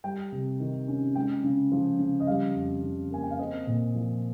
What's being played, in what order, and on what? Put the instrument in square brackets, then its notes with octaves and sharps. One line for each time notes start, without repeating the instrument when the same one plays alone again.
[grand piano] G3 G5
C3
D#3
C#4
G#3 G5
C#3
F3
C#3
D#5
G3 F5
F2
C#3
A#3 G#5
G5
F5
C4 D#5
A#2
F3